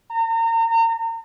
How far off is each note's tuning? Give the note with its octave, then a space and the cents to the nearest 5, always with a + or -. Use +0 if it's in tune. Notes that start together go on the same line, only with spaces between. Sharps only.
A#5 -35